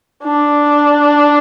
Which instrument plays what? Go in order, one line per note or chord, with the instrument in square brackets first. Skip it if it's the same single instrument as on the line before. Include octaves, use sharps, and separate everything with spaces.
[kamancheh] D4